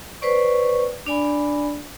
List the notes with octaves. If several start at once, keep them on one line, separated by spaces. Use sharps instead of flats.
B4 C5 D5 C#6
D4 D5 G#5 B5